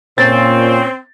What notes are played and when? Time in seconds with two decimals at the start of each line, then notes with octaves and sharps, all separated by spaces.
0.18 A#2 C4 C#4 A6